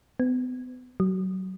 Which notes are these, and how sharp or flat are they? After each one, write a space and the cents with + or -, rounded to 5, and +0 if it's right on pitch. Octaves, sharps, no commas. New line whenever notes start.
B3 +35
F#3 +25